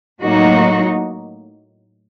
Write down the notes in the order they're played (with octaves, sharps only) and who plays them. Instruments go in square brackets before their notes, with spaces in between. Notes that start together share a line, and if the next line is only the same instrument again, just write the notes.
[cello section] A2 F#3 A#3 D#4 F#4